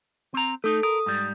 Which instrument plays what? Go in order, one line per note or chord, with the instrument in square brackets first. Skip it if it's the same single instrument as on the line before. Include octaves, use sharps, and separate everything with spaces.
[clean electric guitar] C4 A#5
[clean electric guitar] A3 D#4 [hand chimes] A4
[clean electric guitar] A#4 [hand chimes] D#6
[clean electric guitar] G#2 G3